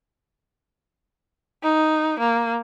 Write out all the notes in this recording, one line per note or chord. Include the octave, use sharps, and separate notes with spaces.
D#4
A#3